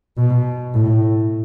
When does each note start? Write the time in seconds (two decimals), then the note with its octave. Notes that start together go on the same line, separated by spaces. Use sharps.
0.17 B2
0.75 A2